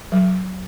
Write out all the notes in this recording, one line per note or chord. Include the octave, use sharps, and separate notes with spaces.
F#3